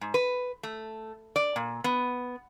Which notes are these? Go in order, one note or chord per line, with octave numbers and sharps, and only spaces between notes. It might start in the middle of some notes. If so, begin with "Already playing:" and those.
G#2
B4
A3
D5
A#2
B3